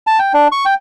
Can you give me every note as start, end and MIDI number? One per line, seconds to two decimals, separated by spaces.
0.07 0.19 81
0.19 0.33 79
0.34 0.48 62
0.52 0.65 85
0.65 0.74 79